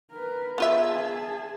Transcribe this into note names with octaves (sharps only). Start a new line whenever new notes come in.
A#4 B4
B3 F4 G#4 E5 A5